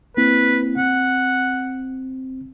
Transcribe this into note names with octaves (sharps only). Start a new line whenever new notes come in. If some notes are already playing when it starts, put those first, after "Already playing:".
A#3 C4 E4 B4
C4 F#5